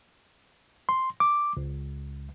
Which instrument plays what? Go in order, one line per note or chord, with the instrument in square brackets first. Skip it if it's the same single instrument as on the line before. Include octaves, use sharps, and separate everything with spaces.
[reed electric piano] C6
D6
C#2